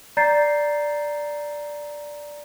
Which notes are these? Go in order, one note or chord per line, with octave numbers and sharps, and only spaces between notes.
D5 A#5 G6 A6 C7